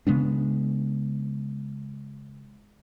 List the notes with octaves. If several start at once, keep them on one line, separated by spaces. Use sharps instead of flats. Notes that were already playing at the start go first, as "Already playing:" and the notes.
C#3 G#3 B3 D4